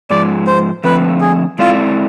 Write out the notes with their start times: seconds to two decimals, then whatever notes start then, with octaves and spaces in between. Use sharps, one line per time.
0.10 G#2 F3 G#3 D5
0.47 C5
0.84 D3 F3 A3 C4 B4
1.21 G#4
1.59 G#3 C4 E4 F4 A4 D5